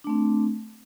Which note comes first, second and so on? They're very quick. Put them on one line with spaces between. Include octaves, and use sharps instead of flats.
D4 A3 C4